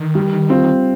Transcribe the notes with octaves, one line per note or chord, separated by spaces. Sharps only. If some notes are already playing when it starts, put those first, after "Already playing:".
Already playing: D#3
G3
C4 F4